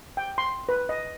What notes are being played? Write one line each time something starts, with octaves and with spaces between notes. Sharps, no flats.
G5
C6
B4
D#5